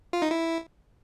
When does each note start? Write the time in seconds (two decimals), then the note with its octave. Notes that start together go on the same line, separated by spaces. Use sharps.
0.13 F4
0.22 D#4
0.31 E4